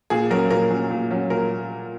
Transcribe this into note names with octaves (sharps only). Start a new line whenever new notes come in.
A#2 G#4
F#3 C#4 A#4
A#2 A#4
F#3 C#4
A#2
F#3 C#4
A#2 A#4